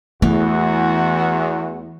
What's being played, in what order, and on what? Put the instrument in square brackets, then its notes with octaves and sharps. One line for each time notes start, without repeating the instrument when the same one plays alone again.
[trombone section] E2 [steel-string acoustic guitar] E3 [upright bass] A3 [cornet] F#4